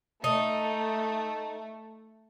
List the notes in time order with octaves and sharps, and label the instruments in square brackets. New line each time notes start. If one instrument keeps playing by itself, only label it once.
[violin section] A3 [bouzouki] D#4